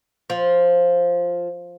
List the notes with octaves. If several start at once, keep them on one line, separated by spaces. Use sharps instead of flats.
F3